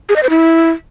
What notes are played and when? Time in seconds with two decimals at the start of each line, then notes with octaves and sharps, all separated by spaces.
0.09 G#4
0.16 D#5
0.23 C5
0.30 E4